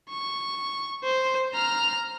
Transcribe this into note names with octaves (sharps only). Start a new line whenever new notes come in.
C#6
C5
A#5 F6